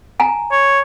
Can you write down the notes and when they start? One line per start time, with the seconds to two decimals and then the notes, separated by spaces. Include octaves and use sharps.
0.20 G#5 A#5
0.51 C#5